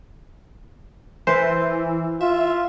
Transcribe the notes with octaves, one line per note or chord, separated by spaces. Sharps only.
E3 B4 C5
F4 E5